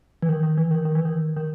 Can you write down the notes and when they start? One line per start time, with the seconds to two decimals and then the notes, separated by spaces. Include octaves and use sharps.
0.23 E3
0.29 D#3
0.43 D#3
0.57 E3
0.71 D#3
0.85 D#3
0.95 E3
1.05 D#3
1.37 D#3